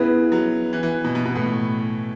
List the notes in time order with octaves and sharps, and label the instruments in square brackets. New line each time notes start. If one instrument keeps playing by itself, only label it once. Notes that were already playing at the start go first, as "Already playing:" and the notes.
Already playing: [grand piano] C#3 [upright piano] B3 E4 B4
[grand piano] F#3
E3
E3
B2
B2
B2
A2